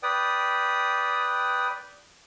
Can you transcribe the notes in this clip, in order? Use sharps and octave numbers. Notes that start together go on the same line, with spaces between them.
B4 D5 G5 D#6